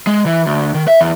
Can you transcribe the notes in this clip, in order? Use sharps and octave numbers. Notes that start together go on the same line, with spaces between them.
G#3
E3
D2
D#3
E5
E2